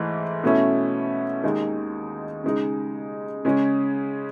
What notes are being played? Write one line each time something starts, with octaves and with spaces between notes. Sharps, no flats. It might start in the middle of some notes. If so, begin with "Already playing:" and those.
Already playing: G#2 E3 A3 E4
B2 A3 C#4 E4
D#2 D#3 G#3 D#4
C#3 G#3 D#4
C#3 G#3 C#4